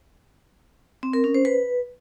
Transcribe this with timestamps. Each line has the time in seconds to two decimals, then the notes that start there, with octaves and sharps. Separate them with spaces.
1.03 C4
1.13 A#4
1.24 C#4
1.34 C5
1.45 B4